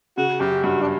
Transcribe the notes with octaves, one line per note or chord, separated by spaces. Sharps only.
C#3 F#4
F#2 G4
G2 F#4
D4